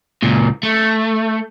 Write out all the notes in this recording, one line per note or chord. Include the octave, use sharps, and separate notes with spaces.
C#2 A#2
A3